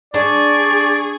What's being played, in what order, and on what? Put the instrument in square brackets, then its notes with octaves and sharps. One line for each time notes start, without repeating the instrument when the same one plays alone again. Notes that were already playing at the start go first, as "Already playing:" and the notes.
[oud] D4 [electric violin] G#4 C#6 [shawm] D5